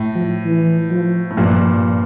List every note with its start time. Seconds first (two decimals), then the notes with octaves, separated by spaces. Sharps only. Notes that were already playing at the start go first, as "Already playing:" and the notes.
Already playing: A2
0.15 F3
0.45 E3
0.91 F3
1.31 A2
1.37 G2 A#2 F3